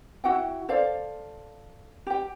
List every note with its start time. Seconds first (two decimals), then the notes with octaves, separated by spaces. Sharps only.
0.24 E4 F#4 F#5 G5
0.69 A4 C5 D5 F5
2.07 G4 G5